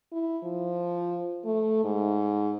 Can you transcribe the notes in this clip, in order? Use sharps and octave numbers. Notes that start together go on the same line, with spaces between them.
E4
F3
A3
G#2